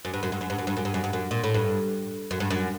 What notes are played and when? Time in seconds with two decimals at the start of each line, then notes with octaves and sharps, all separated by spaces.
0.05 F#2
0.14 G2
0.23 F#2
0.32 G2
0.41 F#2
0.50 G2
0.58 F#2
0.67 G2
0.77 F#2
0.85 G2
0.94 F#2
1.04 G2
1.13 F#2
1.31 A#2
1.43 A2
1.54 G2
2.31 F#2
2.40 G2
2.50 F#2